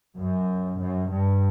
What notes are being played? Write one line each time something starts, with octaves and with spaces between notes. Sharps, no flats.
F#2
F#2
G2